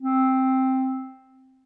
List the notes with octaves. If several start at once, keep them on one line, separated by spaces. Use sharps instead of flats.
C4